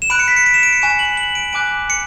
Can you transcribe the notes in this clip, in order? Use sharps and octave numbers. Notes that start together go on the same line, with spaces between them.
E7
B5 F#6 D7
C#7
B6
C#7
D7
E7
D7
C#7
G#5 C#6 F#6 E7
F#7
F#7
D7
G#5 D6 F#6 D7
C#7